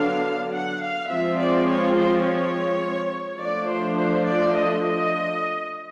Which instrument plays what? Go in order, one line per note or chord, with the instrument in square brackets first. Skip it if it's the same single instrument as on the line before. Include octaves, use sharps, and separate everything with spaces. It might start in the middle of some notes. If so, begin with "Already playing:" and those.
Already playing: [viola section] D3 F#3 B3 D4 F5
F#5
F5
F3 G#3 C4 E5
D5
C#5
C5
C#5
F3 A3 D4 D5
C5
C5
D5
D#5
D#5